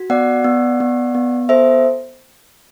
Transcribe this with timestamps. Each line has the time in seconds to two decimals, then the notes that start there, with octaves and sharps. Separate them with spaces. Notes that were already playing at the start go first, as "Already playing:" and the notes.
Already playing: F#4
0.10 B3 D5 F#5
0.44 B3
0.80 B3
1.15 B3
1.49 A4 C5 E5